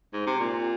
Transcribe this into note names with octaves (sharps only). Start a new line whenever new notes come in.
G#2
C3
A#2